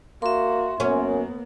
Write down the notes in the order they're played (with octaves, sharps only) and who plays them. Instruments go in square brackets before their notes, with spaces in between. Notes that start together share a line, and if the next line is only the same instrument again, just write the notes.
[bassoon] A#3 [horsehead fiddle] F#4 [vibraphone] E5 C6
[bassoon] F#2 [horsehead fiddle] A#3 B3 [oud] C#4